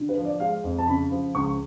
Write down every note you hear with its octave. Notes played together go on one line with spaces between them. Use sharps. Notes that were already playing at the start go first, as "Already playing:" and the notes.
Already playing: D3
B4
F3
D5
G#3 F5
F2
A5
C#3 B5
F3
C#2 C#6